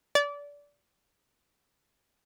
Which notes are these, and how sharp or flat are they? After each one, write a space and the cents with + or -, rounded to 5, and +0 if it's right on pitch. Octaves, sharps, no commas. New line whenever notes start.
D5 -25